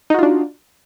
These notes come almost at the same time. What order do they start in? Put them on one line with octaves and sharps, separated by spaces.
D#4 F#4 F4 D4